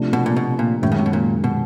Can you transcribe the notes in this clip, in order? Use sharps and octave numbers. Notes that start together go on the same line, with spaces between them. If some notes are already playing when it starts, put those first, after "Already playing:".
Already playing: C3 F3 A3 D4
B2
A#2
B2
A#2
F#2 A2 D#3 G#3
C#3
C3
B2
A#2
B2